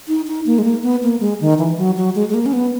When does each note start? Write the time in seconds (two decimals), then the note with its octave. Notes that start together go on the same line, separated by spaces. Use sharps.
0.08 D#4
0.28 D#4
0.46 A#3
0.59 G#3
0.64 A#3
0.83 B3
1.03 A#3
1.21 G#3
1.41 D#3
1.59 E3
1.78 F#3
1.97 F#3
2.15 G#3
2.29 G#3
2.34 A#3
2.46 C#4
2.53 B3